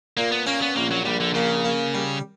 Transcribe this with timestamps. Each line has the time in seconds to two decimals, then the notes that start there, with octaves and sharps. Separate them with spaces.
0.17 A#2 A#3
0.32 B3
0.46 A#3 C#4
0.62 B3
0.76 A#1 A#3
0.91 F#3
1.05 A#1 G3
1.20 D3
1.34 C#3 A#3
1.64 A#3
1.94 G3